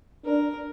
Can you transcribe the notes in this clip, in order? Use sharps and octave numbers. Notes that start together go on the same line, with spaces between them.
D4 A#4